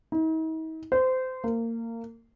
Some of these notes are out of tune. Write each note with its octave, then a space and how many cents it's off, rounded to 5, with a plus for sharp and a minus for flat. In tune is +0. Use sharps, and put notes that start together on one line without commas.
D#4 +45
C5 -25
A#3 -25